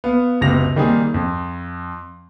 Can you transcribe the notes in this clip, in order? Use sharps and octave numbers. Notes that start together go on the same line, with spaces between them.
B3 F5
F#1 C#2 C3 B3 A#6 F7
D#3 G3 A#3 C4 G#4
F2